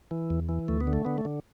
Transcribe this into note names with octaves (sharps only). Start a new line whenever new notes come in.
E3
E2
E3
D2 A3
B3
D3
A3
D3 B3
A3
D3